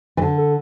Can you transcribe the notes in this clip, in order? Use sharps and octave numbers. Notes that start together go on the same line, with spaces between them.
E3
D3
A4